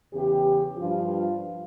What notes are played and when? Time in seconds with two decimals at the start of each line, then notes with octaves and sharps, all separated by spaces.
0.14 E2 C#3 E3 G4
0.77 G2 F3 F4